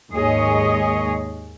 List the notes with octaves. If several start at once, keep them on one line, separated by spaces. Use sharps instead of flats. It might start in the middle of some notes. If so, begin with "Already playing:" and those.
D#2 G#2 G#4 C#5 D#5